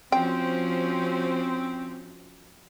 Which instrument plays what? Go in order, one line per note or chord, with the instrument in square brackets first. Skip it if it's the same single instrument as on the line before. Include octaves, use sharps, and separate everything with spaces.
[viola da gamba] F3 C#4 F#4 [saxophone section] C4 [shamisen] G5